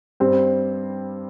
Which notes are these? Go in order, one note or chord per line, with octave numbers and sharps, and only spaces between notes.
G2 G3 C4 G4 C5